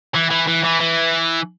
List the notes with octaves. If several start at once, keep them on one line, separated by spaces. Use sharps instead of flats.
E3
E3
E3
E3
E3